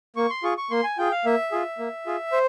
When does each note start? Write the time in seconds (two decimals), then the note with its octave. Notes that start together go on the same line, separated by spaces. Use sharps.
0.16 A#3 C#6
0.30 C6
0.43 F4 G#4 C#6
0.58 C#6
0.70 A#3 C6
0.84 G#5
0.98 F4 G#4 G5
1.11 F5
1.25 A#3 E5
1.52 F4 G#4
1.78 A#3
2.06 F4 G#4
2.32 C5